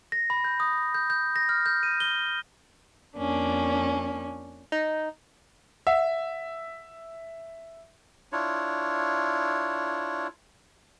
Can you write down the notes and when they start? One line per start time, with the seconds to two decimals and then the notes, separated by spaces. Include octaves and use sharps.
0.12 A#6
0.30 B5
0.44 G6
0.60 D#6
0.94 G6
1.10 G6
1.36 A#6
1.49 F6
1.66 G6
1.83 D#7
2.00 G7
3.17 F2 A#3 C#4 D4
4.72 D#4
5.87 E5 F#5
8.32 D4 E4 F4 C#5